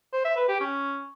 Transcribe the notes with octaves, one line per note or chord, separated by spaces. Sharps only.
C5
E5
B4
G4
C#4